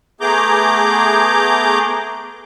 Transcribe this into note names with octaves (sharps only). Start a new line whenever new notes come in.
A3 B3 G#4 A#5 D6 G6